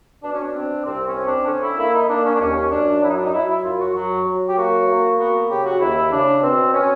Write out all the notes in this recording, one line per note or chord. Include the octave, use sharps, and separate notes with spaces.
B2 D4
C#4
D4
C4
C2 C4
C#4
C4
D4
D3 C#4
E4
A#3 E4
D#4
A#3 D4
C#4
D4
D#2 C#4
C#4
F#2 D4
F#3 E4
D#4
D4
D#4
F#3 E4
E4
F#2 F4
F#4
F#3 F#4
F#3
G4
A#3 F#4
A#3
B3 F#4
C#3 G4
F#4
D#2 E4
C#3 D4
B2 C4
B2 C#4